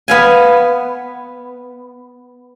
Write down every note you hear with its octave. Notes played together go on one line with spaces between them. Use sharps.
B3 F5 G#5